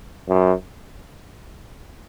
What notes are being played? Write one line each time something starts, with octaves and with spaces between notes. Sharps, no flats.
F#2